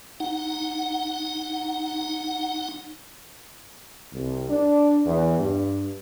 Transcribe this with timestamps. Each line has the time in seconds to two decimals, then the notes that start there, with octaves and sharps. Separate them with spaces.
0.20 D#4 F#5
4.13 C2
4.50 D4
5.05 E2
5.39 G2